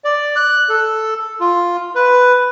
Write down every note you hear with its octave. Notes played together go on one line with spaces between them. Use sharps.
D5
F#6
A4
F4
B4